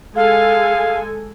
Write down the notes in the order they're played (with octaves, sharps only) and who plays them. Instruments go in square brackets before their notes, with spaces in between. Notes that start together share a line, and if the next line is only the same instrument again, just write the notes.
[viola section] G#3 A4 G#5 [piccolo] F5